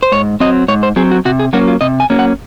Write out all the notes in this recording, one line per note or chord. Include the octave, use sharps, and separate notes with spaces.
C5
G#2 C#5
F#3 C4 D#5
G#2 C#5
C5
F#3 C4 G#4
F#4
C3 F#4
G#4
F#3 A#3 C#4 F#4
F4
C3 D#5
G#5
F#3 A#3 C#4
F#5